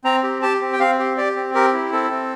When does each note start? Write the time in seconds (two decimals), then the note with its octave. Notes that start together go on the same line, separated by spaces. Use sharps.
0.04 C4 A#5
0.23 G4
0.42 G4 A5
0.61 C4
0.73 G5
0.80 C4 F5
0.99 G4
1.17 G4 D5
1.36 C4
1.54 G4 A#4
1.73 E4
1.92 C4 A4
2.11 C4